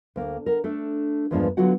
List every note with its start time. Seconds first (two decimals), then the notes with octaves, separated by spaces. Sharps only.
0.16 D2 A#3
0.46 A#4 F#5
0.64 A3 D4 A4
1.31 E2 G2 F3 G#3 A#3 D4
1.57 D3 F#3 B3 F4 F#4 F#5